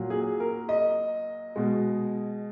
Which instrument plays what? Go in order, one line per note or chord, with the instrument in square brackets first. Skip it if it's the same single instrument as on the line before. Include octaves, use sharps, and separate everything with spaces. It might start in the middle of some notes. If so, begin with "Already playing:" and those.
Already playing: [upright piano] A#2 F#3
G#4
A#4
D#5
B2 G#3